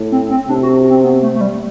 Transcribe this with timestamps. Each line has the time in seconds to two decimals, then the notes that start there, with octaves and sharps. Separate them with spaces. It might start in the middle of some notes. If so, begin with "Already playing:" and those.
Already playing: A2
0.12 C4
0.30 C4
0.48 C3 D4
0.63 F#4
0.90 C4
1.04 B3
1.23 A3
1.35 A3
1.41 G3